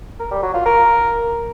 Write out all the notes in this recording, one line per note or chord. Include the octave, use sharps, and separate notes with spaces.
A#4
G3
F#3
F4
A#4